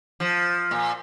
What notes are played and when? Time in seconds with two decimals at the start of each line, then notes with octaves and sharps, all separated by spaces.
0.20 F3
0.71 A#2